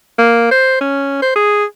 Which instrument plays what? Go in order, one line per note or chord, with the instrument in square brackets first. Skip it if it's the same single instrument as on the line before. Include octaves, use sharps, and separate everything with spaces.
[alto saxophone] A#3
C5
C#4
C5
G#4